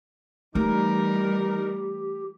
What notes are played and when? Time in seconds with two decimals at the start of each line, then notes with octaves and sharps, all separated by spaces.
0.55 E3 G3 A3 D#4 G4 A#4